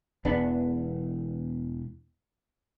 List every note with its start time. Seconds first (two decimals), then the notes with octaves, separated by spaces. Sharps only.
0.25 E1 E2 B3 D4